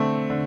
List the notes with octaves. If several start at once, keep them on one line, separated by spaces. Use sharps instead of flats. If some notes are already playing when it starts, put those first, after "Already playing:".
Already playing: D3 A3 C4
D3